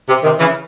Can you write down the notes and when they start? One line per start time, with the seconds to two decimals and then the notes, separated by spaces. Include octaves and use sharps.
0.08 C3
0.23 C3 D#3
0.39 C#3 E3